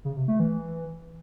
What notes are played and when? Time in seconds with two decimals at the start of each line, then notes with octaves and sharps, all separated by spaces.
0.05 C#3
0.16 C3
0.28 A3
0.40 E3